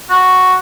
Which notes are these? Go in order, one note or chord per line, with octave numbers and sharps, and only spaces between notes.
F#4